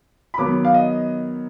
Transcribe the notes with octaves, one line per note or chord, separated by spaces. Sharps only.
B5
D#3 F#3 B3 D6
F5
D#5